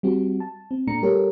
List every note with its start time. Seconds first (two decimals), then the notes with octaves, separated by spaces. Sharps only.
0.03 G3 C4 F#4
0.40 A5
0.71 C4
0.87 A#2 A3 D4 A#5 C#7
1.03 G3 G4 A4 A#4 C#5